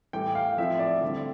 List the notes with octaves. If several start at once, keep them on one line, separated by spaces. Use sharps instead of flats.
A2 E3 G3 G5
F5
A2 F3 C4 E4 E5
D5
D3 G3 C4 E4